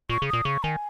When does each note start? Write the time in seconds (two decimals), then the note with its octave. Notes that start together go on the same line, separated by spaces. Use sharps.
0.09 A#2 C#6
0.22 C#3
0.28 D#6
0.33 A#2
0.45 C#3 C#6
0.63 D#3 G#5